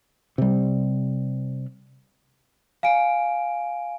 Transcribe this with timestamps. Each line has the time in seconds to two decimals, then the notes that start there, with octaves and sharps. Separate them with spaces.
0.38 C3 G3
2.83 F5 G#5 D7